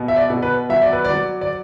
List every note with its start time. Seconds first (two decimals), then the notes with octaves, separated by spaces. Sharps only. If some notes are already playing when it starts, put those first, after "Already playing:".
Already playing: B2
0.08 E5
0.16 D5
0.30 B2
0.43 B4
0.69 F#3 E5
0.82 D5
0.93 B4
1.05 D5
1.10 F#3
1.41 D5